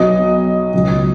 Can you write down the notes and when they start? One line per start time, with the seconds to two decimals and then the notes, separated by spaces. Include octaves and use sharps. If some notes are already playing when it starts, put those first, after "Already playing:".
Already playing: B1 B2 F#3 D#5 D#6
0.74 C#2 B2 F#3